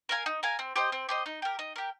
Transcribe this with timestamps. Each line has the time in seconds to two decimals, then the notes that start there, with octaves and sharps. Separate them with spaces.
0.09 A#4 F5 G#5
0.26 D#4
0.43 A#4 F5 G#5
0.59 C4
0.76 G4 C5 D#5
0.92 C4
1.09 G4 C5 D#5
1.26 D#4
1.42 G4 A#4
1.59 D#4
1.76 G4 A#4